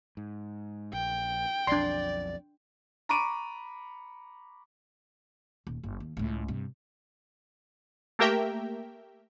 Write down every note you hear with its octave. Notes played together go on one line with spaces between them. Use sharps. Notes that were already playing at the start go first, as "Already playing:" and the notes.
G#2
A#1 G5
B1 F2 D4 D5 C6
A#5 B5 C#6 D6 D7 D#7
D#1
F#1
D#2
C#2 A2
G2 C3
A3 A#3 G4 A#4 E5 G5